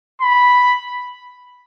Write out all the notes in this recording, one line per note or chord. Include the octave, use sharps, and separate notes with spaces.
B5